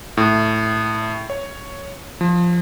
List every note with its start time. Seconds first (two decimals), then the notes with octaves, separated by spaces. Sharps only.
0.17 A2
1.30 C#5
2.21 F3